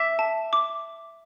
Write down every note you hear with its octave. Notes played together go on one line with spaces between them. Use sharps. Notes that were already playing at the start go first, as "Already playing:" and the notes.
Already playing: E5 D6
A5
D6